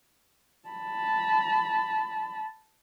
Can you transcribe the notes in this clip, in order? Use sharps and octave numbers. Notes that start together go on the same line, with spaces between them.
A5 B5